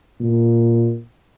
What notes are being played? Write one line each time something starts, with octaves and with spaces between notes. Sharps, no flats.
A#2